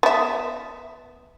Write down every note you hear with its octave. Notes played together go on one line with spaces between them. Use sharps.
B3 E5